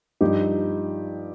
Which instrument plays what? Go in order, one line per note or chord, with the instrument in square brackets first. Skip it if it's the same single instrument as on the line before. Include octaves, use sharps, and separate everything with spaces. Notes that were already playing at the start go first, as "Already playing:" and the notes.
[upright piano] G2 F3 D#4 G4